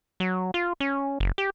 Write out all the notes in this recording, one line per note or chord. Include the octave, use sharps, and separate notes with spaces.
F#3
F4
C#4
F#1
G4